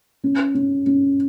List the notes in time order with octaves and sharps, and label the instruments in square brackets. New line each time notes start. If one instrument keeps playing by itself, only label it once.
[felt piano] C#4
C#4
C#4